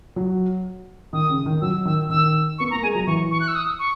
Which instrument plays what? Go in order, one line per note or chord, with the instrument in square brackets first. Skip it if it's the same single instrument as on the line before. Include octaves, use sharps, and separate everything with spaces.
[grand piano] F#3
[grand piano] D#3 [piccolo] D#6
[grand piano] C#3
D#3
[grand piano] F#3 [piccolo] E6
[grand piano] D#3 [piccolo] E6
[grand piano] D#3 [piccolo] E6
[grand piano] B3 [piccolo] C#6
[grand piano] A#3 [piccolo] A#5
[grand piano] G#3 [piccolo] G#5
[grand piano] F#3 [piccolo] A#5
[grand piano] E3 [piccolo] C#6
[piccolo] C#6
F#6
E6
D#6
C#6